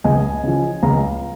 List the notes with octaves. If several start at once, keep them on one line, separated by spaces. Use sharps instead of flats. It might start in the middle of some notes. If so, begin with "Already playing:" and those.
C#2 D#5 G#5
C#3 F3
C#2 F5 A#5